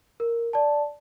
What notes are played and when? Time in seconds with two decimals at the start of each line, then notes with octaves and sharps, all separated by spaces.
0.20 A#4
0.53 D5 A5